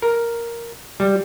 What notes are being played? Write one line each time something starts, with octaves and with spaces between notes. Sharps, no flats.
A#4
G3